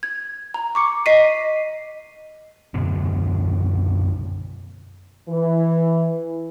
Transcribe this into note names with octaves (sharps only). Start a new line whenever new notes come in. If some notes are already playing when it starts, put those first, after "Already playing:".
G#6
A#5
C#6 D6 C#7
D#5 B6 C7 D#7
F#2 B2 D3
E3